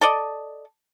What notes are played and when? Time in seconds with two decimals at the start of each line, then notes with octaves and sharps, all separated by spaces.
0.01 A4 D5 D#5